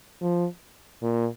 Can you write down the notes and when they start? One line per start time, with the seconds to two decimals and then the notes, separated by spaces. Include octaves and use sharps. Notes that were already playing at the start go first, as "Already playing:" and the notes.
0.21 F3
1.02 A#2